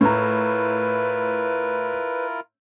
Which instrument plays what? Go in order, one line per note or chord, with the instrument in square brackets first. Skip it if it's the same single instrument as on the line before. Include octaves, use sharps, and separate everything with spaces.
[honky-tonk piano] A2 A#5 [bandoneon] E4 F4 A#4 [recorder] B4